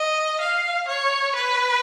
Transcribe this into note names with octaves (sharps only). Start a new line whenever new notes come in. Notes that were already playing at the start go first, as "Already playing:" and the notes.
Already playing: D#5
F5
C#5
B4